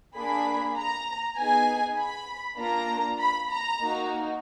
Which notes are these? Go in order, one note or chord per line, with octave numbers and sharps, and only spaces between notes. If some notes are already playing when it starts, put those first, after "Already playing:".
A#3 D4 G#4 B5
A#5
B3 D#4 G#4 G#5
B5
A#3 D4 F4 A#5
B5
A#5
A#3 D#4 F#4